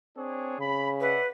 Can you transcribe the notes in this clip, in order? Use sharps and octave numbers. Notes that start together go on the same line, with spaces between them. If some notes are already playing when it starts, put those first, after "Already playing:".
C4 D4 G#4 C#5
C#3 B5
B4 D5 E5 F#5